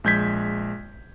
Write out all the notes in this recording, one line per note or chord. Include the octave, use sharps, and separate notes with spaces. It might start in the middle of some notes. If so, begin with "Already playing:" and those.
A#1 G#3 G6 G#6 B6